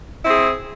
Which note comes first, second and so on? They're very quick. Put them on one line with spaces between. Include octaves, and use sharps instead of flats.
E4 C4 G#4